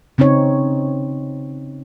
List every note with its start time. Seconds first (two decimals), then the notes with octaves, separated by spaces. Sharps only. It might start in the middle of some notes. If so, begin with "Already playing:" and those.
0.18 C#3 C4 C#4 D#4 C#5